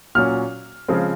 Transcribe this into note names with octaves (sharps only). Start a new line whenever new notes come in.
A#2 F#3 C#4 F6
C#3 F3 G#3 C4